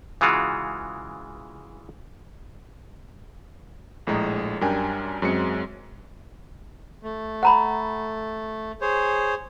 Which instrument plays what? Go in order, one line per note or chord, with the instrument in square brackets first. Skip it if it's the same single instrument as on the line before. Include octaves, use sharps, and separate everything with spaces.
[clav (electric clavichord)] C#3 E3 G#3 F4 F#4
[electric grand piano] A#1 A2 G#3 A#5
F#2 G3 D4 A#4 G5 G#5
F#2 F#3 G#3 C4 C#7
[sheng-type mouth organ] A3
[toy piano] F#5 A#5 B5
[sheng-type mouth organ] G#4 C5 C#5